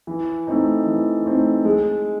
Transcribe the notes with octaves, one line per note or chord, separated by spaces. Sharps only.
E3
A3 C4 D#4
E3
A3 C4 D#4
G#3